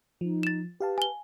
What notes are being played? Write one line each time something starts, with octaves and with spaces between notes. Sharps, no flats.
F3 D#4
A6 E7
G4 B4 F5 A5
G#5 G7